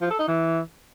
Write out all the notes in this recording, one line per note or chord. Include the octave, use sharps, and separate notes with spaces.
F3
A4
D#4
E3